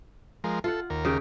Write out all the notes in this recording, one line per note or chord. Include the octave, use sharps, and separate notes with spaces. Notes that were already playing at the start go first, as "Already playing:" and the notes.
F3 G#3 A#4
F4 A4 F#5
D#2 A#4
C#3 G4 G5